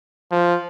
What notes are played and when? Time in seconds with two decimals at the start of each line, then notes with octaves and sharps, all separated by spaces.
0.31 F3